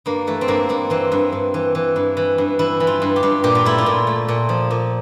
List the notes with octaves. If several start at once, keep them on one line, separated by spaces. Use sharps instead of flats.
G2 A#3
E3 A3
C4
G2 A#3
G2 A#3
E3 C4
G2
G2
E3
E3
G2
E3
G2
E3 E4
E3
F4
G2
G4
G2
A#2 G4
F4
A3 E4
F4
A#2
A3
A#2
F3
A#2